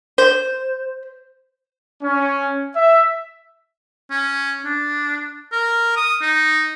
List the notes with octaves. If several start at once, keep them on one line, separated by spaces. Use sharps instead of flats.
C5
C#4
E5
C#4
D4
A#4
D#6
D#4